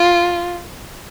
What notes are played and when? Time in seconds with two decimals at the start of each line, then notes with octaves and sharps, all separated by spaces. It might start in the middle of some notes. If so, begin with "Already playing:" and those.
Already playing: F4